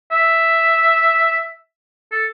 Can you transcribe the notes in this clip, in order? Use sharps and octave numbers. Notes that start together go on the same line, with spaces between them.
E5
A4